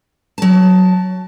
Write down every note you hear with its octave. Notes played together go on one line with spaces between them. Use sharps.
F#3 A5